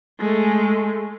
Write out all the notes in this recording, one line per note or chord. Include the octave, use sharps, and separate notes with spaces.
G#3 A3